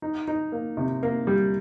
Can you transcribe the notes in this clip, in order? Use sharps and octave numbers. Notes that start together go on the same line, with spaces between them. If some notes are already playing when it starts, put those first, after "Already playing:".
D#4
D#4
A#3
C3
A#3
G3